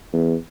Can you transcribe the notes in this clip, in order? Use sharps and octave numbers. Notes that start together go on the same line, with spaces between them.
E2